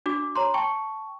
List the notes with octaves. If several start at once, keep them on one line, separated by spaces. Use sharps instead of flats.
D4 F#4 D6
C#5 A#5 C6
G5 A5 C#6